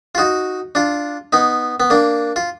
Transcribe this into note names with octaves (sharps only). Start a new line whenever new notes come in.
F4
D#4 F#4
D4 F4
B3 D#4
B3
A#3 D4
F4